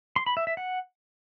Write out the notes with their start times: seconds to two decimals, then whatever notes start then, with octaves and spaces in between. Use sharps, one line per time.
0.16 C6
0.26 B5
0.37 E5
0.47 E5
0.57 F#5